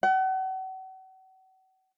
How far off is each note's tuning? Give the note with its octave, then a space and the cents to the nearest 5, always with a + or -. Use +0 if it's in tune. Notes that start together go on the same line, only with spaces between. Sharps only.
F#5 +35